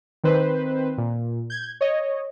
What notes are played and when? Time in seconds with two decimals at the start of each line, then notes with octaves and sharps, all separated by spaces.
0.24 D#3 C4 B4 C5
0.98 A#2
1.50 G6 G#6
1.81 C#5 D#5